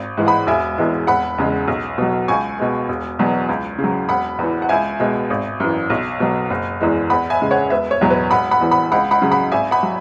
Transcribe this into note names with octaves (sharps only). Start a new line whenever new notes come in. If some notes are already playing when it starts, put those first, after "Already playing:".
Already playing: G#1
G#2 E3 G#3
F#5 B5
E1 E5 G#5
E2 E3 G#3
E1 F#5 B5
E2 C#3 G#3
B1
B2 F#3
C#2 G#5 C#6
B2 G#3
E1
E2 B2 F#3
C#2
C#3
F#3
E1 F#5 B5
E2 E3
F#5
C#2 E5 G#5
B2 G#3
G#1
F#2 E3
B1
B2 F#3
F#1
E2 E3 G#3
E2 F#5 B5
E5 G#5
C#3 G#3
C#5 F#5
E1 B4 E5
C#5
E2 B2 F#3
B4
E1 F#5 B5
F#5 B5
E2 E3
F#5 B5
C#2 F#5 B5
F#5 B5
C#3 F#3
F#5 B5
G#1 E5 G#5
F#5 B5
F#3